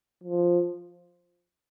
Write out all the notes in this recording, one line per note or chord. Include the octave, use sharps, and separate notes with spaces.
F3